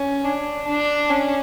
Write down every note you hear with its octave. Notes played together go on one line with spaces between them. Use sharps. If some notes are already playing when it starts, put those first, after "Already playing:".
Already playing: C#4
D4
D4
C#4